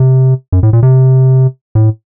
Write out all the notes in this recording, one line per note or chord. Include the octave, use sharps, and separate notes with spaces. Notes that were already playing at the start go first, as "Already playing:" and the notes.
Already playing: C3
F#2
A2
A#2
C3
A2